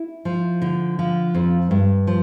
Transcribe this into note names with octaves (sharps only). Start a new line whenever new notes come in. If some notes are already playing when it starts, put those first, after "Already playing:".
Already playing: E4
F3
D3
F3
F2
G2
F3